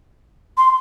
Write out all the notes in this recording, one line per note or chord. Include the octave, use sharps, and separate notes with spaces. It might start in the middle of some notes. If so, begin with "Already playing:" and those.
C6